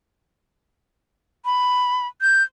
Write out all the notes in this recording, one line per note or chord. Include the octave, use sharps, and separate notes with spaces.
B5
G6